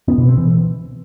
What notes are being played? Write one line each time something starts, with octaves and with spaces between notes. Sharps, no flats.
B3
B2
C4
E3